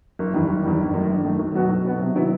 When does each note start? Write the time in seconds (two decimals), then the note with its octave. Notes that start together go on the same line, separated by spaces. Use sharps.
0.19 F#1
0.34 E2 D#3 G3
0.49 F#1
0.64 E2 D#3 G3
0.79 G1
0.94 F#2 D#3 A3
1.09 G1
1.24 F#2 D#3 A3
1.39 B1
1.54 B2 F#3 B3 F#4
1.69 B1
1.84 B2 F#3 B3 F#4
2.00 C3
2.15 D#3 F#3 B3 E4